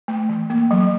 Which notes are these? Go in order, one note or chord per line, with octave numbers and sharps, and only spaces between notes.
A3
E3
A#3
F#3